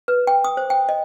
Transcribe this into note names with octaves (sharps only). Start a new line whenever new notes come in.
B4
G5
D#6
C5
G5
D#5